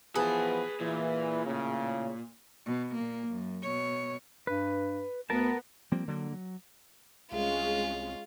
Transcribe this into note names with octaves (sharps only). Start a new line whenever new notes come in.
E3 F3 B3 G#4 B4 A5
A#2 E3
A2 C#3
B2
A#2 A#3
F#2
B2 C#5
G2 B4
D2 B3 A#4 A5
F3 G3 A#3 C4
D3 F#3 A#3
F#3
C2 G#3 C#4 F4